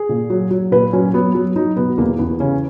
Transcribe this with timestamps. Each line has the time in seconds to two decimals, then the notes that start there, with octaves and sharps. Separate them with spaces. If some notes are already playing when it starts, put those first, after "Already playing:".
Already playing: G#4
0.09 A#2
0.30 F#3
0.51 F#3
0.72 A#2 B4
0.93 F#3 C#4
1.14 F#3 B3
1.35 F#3
1.56 F#3 D#4
1.76 B2 B3
1.98 E2 A#3
2.19 E2 B3
2.40 C#3 C#4